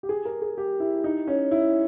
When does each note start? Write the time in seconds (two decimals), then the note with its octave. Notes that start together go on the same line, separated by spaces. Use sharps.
0.03 G4
0.09 G#4
0.25 A#4
0.42 G#4
0.58 G4
0.80 E4
1.04 D#4
1.27 C#4
1.51 E4